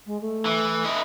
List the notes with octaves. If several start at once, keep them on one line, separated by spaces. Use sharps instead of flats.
G#3
A3
E3
E4 D#5